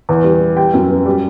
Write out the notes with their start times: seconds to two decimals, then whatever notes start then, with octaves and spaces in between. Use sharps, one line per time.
0.09 E2
0.24 G3
0.40 G3
0.57 G3 G5
0.74 F#2
0.90 B3
1.06 G3